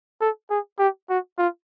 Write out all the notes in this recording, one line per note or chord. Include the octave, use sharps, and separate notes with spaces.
A4
G#4
G4
F#4
F4